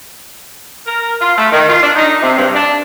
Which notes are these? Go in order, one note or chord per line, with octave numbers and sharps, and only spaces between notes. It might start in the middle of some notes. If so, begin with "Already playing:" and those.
A#4
F4
A3
D#3
F4
D4
D#4
C3
G2
D4